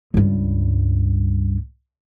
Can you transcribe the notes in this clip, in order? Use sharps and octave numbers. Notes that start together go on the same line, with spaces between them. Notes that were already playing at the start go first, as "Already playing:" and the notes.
C#2 G2